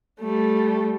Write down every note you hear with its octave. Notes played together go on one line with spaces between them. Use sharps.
G3 A3